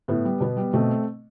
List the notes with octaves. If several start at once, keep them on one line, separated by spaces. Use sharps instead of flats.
A2 B3
G3
B2 B3
G3
B2 A3 C4